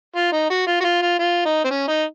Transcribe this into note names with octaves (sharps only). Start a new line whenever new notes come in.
F4
D#4
F#4
F4
F#4
F4
F4
F4
D#4
C4
C#4
D#4